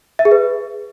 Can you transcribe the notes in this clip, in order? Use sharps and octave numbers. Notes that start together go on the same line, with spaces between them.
E5
G#4
B4